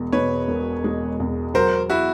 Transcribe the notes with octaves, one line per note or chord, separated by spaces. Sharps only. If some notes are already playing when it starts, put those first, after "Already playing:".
Already playing: E1 E2 G#3
B2 B4 C#5
E1
G#3
E2
F#3 A#4 C5
E4 F#4